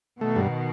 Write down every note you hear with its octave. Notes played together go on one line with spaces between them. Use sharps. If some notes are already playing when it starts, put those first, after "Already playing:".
B2 D#3 A3
G2